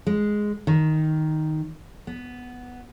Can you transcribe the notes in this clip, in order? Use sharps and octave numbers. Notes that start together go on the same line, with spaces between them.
G#3
D#3
B3